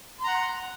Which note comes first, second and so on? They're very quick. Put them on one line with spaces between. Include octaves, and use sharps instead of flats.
C6 A#5 F#5